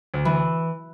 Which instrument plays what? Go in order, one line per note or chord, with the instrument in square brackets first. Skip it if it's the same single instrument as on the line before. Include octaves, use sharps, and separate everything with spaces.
[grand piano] D2
[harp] E3